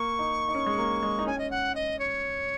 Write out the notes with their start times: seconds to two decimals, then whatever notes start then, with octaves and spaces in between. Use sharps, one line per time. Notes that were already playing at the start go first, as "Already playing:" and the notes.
Already playing: A#3 C#6
0.19 D#4
0.49 D#4
0.55 C#4
0.66 G#3
0.78 A#3
1.03 G#3
1.19 D#4
1.26 C#4 G#5
1.38 D#5
1.50 F#5
1.75 D#5
1.98 C#5